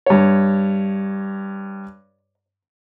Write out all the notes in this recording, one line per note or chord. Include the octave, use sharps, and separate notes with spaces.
G2 C#5